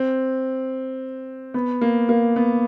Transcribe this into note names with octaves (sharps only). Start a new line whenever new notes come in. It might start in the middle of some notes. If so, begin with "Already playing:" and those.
Already playing: C4
B3
A#3
A#3
B3